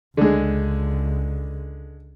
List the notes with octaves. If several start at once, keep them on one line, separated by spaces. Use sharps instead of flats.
C#2 D3 G#3